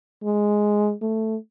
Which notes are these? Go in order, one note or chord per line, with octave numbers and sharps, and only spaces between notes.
G#3
A3